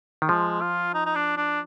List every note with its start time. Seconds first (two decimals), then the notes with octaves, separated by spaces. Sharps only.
0.22 D#3
0.28 F3 G#3
0.61 F4
0.94 D#4
1.06 D#4
1.15 D4
1.37 D4